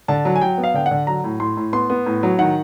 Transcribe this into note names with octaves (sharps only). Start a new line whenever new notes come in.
D3 A5
F#3
G#5
F#3 G5
B3
F5
D3 G5
F#5
D3
F#3 A#5
A2
A2 C6
A2
B3 C6
B3
A2
F#3
D#3 F#5